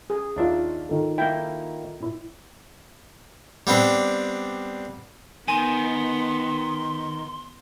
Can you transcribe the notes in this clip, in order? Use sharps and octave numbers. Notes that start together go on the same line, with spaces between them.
G#4
D#2 D4 D#4 F4 E5
D#3 F4 A4
A#3 D#4 E4 G5
A#2 E4
G3 B3 C4 D4
D#3 B3 G#5 C6